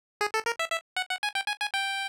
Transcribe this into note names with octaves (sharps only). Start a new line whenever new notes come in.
G#4
A4
A#4
E5
E5
F#5
F#5
G#5
G5
G#5
G#5
G5